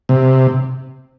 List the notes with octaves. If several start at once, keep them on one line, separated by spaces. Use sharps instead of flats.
C3